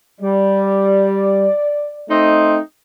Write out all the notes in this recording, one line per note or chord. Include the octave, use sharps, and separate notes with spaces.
G3 D5
A3 C4 D#4